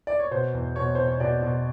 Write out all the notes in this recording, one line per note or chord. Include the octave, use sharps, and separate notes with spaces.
D5
C#5
B2 C5
E2
B2 C#5
B2 C5
C#5
B2 D5
B2